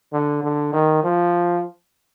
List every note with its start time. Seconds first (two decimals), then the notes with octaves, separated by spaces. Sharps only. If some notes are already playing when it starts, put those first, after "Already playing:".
0.13 D3
0.43 D3
0.73 D#3
1.04 F3